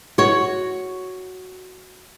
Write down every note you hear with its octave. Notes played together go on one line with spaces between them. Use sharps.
F#4 C#5